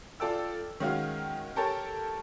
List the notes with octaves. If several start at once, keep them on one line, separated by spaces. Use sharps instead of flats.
F4 A4 D5 G5 E6
D#3 G#3 C#4 F#4 F5 F6
G4 A4 A#4 C#5 G5 A5